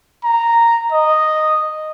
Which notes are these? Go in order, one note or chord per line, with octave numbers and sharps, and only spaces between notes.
A#5
D#5